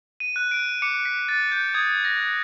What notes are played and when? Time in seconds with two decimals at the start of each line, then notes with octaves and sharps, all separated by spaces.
0.20 D#7
0.36 F#6
0.51 D7
0.82 D6 C#7
1.05 B6
1.28 F#6 A6
1.52 G6
1.74 D#6 G#6
2.05 A#6
2.21 F#6